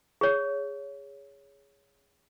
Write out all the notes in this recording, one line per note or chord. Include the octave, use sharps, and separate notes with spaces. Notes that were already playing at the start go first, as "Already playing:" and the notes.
G#4 C#5